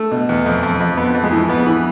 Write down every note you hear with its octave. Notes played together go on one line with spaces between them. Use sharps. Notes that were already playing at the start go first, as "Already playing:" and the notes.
Already playing: A3
B2
E2
F2
F2
F2
F2 B3
F2
G#3
E3
F2 B3
E3